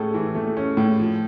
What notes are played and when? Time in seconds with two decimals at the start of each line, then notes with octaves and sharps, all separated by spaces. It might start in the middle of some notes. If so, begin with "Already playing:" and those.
Already playing: A2 A3 C#4 G#4 A4
0.14 E3
0.35 A3
0.57 C#4
0.77 A2
0.99 F3